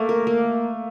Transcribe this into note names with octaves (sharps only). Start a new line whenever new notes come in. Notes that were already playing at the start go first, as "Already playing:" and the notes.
Already playing: A3 A#3
A#4
A#3